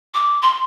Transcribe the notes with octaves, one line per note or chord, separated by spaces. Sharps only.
D6
C6